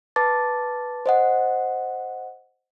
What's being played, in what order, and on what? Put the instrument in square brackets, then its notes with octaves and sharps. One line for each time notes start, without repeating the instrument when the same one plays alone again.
[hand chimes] B4 A5 D6 A6
C5 D#5 F#5